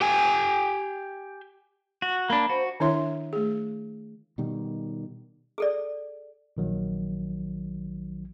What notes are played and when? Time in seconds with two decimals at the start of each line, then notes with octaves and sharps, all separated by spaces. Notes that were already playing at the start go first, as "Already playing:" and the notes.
0.01 G4 G5 G#5
2.02 F#4
2.30 A#3 D4 B5
2.49 F#4 C5
2.80 D#3 D4 E4 C#5 E5 C6
3.33 A3 G#4
4.38 B2 D#3 G3
5.58 G#4 A4 D5
6.57 A#1 D#3 F#3